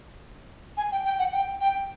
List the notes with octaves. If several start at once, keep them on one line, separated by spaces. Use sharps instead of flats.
G#5
G5
G5
F#5
G5
G5